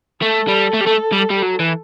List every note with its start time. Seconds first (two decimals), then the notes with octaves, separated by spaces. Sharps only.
0.22 A3 A4
0.48 G3
0.74 A3
0.81 G3
0.87 A3
1.13 G3
1.30 G3
1.43 F#3
1.60 E3